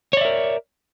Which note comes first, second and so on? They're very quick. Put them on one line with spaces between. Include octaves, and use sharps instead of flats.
C#5 D5 E5 A#4